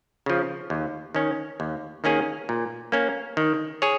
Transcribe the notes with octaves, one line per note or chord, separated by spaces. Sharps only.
C#3 F3
D#2
D#3 C#4
D#2
D#3 A#3 C#4 G#4
A#2
A#3 C#4
D#3
G#4 C#5